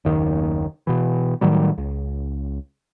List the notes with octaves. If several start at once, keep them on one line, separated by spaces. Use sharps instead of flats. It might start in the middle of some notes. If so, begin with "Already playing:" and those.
F#1 D#2 D#3
B2 E3
A2 D#3 F#3 G3
C#2